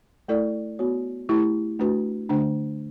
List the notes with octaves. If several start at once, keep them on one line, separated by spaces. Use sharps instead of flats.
A3 E4 A4 D5
B3 F#4 C#5
A3 E4 G4
A3 D4 F#4 B4
D3 A3 D4